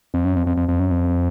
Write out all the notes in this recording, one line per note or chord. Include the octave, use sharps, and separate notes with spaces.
F2
F#2
F2
F2
F2
F2
F#2
F2